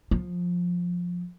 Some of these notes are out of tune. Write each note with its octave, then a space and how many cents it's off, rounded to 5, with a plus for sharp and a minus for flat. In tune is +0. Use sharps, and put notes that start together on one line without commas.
F3 +15